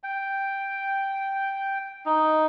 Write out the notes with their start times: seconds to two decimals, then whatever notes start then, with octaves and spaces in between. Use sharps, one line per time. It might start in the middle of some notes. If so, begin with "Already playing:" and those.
0.03 G5
2.06 D#4